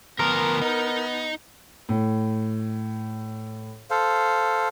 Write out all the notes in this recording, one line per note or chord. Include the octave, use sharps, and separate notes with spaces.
D2 F3 B3 A#4
D#4
A2
A4 C5 F5